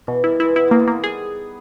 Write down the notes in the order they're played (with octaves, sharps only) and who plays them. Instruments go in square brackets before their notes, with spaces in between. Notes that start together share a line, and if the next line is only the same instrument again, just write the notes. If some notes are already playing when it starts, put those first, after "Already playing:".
[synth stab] B2 [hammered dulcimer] E3
[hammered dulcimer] D#3 G3 [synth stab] E4
[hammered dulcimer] E3 G#3 [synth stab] E4
[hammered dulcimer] G#3 B3 [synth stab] E4
[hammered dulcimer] G#3 B3 [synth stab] A#3
[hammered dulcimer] G#3 B3
[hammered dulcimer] D#3 [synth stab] A#3
[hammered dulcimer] G3 [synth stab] G#4